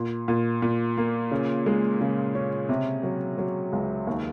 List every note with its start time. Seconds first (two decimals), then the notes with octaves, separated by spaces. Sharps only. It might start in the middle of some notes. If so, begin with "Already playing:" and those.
Already playing: A#2
0.28 A#2
0.62 A#2
0.97 A#3
1.31 C#3
1.66 G#3
2.01 C#3
2.35 C#4
2.69 C3
3.03 F#3
3.38 F#3
3.72 C#2
4.07 D#2